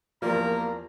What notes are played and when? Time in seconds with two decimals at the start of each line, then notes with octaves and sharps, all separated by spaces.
0.22 E2 F3 A#3 G4 A#4 D5 A#5